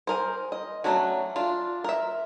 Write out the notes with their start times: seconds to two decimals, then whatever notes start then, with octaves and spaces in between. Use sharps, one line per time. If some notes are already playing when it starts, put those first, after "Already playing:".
0.07 G#4 A#4 C5
0.52 D#5
0.84 F#3 A3 C#4 D4 F#4
1.36 D4 F4
1.84 A#4 E5